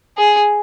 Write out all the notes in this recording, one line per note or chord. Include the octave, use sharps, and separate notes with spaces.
G#4